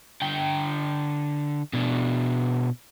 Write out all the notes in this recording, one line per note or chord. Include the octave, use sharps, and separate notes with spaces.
D3 G5
B2 D4